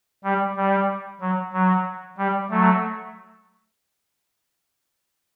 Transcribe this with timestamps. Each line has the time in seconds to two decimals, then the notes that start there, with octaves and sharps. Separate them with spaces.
0.24 G3
0.56 G3
1.21 F#3
1.53 F#3
2.18 G3
2.50 F#3 A3